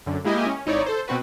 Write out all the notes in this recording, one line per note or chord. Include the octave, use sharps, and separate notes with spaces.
F#2 D3
G#3 A#3 E4 G4 D#5 G#5
C#4
G#1 D#4 E4 C#5 D5
A4 C5
B2 C4 F#4 B4